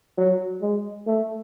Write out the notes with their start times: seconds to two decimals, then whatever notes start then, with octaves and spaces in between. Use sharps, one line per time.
0.18 F#3
0.61 G#3
1.07 A3